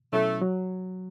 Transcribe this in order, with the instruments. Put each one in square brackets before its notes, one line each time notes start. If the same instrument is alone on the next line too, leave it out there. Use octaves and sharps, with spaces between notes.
[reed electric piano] B2 F#3 C#4 E4 [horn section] A3
[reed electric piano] F#3